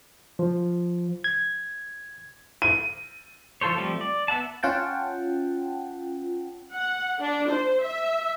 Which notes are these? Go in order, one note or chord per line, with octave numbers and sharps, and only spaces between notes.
F3
G#6
D#7
F3 F4 A4 C5 C#5
F3 G3 A3 C4
D5
B3 E5 F#5 A5
C#4 F4 F#5 G5 A5
F#5
D4
C5
E5